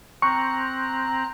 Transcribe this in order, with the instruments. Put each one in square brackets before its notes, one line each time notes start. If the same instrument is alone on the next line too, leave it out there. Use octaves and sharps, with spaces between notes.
[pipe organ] C4 A#5 F#6 [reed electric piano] C#6